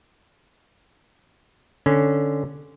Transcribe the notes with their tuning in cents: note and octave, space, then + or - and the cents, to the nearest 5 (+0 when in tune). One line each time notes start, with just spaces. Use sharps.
D3 +0 C#4 +0